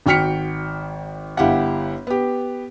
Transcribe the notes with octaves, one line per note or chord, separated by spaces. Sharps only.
G#1 F#4 G5 F6 B6 C#7
G1 E4 G4 F5 F#5
B3 G4